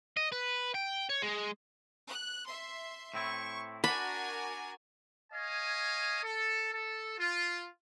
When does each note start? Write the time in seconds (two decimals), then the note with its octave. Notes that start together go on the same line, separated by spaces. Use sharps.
0.17 D#5
0.32 B4
0.75 G5
1.10 C#5
1.22 G#3
2.08 F#6
2.45 E5 C6
3.14 A2 C4 E4 C#6
3.84 D4 F#4 A#4 G#5 B5
5.33 C#5 D#5 F5 G#5 D#6
6.23 A4
6.73 A4
7.19 F4